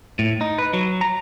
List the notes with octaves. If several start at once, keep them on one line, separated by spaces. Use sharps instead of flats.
A2
D#4
B4
F#3
A#5